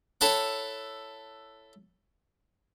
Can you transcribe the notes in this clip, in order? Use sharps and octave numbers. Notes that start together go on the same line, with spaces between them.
E4 A4 C#5 F#5